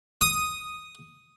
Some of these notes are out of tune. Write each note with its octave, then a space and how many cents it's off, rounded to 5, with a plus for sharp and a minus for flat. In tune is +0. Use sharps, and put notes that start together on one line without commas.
D#6 +0